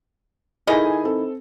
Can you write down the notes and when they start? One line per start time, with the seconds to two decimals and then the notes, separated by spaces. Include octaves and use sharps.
0.67 D#3 E4 G#4 A4 D#5 G#5
1.03 C4 A4